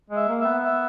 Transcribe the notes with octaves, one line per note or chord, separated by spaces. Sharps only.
G#3
E5
A#3
E5
B3
E5